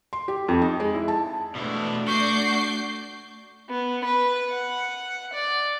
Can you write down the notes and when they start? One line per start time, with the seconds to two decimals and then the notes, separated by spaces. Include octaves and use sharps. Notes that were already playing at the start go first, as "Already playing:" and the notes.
0.13 C6
0.28 G4
0.48 F2
0.62 D#4
0.80 G#3
0.95 E4
1.08 A5
1.55 B2 A3 D4 E4
2.08 F#4 C#6 D6 G6 C7
3.70 B3
4.05 B4
4.50 F#5
5.34 D5